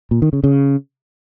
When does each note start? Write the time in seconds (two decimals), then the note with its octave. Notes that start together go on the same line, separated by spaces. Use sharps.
0.11 A#2
0.22 D#3
0.33 C#3
0.44 C#3